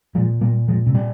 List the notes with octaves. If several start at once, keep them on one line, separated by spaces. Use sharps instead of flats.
A#2 F3 G#3
A#2 G3 A#3
A#2 F3 G#3
G#2 C3
G3